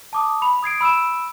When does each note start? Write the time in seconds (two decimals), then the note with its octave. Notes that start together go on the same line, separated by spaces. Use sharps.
0.13 A5 D6 D#6
0.42 B5 F7
0.63 D#6 G#6 C7 D7
0.81 B5 E6 D7 E7